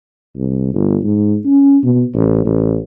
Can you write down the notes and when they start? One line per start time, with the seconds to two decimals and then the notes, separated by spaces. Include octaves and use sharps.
0.36 C2
0.74 G1
1.03 G#2
1.45 C#4
1.83 B2
2.14 A1
2.45 A1